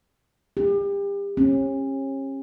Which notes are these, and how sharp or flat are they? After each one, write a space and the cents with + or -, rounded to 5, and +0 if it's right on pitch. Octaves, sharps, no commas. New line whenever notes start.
G4 +35
C#4 -35